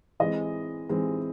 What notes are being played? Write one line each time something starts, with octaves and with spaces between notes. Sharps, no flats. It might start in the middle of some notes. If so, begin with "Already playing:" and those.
E3 G#3 C4 D#5
E3 G#3 C4